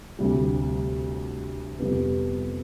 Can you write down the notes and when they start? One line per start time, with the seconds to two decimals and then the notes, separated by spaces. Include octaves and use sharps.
0.19 D2 C3 G3
1.79 F2 C3 G3 B3